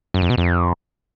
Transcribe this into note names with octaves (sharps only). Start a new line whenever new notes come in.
F#2
F2
B2
F2